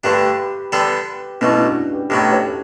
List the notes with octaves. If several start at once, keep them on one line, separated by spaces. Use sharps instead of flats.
G2 D3 A3 D4 G4 B4
D3 G3 B3 D4 A4
B1 B2 A3 C#4 E4
D4 F#4
G4 B4
B1 A2 F#3 B3 G4 B4
A4 C#5